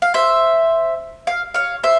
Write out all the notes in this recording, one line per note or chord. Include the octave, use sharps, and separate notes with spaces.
F5
C5 E5
F5
C#5 F5
C5 E5